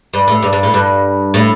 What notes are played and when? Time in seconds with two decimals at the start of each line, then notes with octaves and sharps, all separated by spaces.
0.13 G2
0.28 A2
0.43 G2
0.53 G2
0.63 A2
0.74 G2
1.34 A2